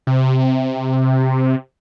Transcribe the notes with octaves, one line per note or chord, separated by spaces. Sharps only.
C3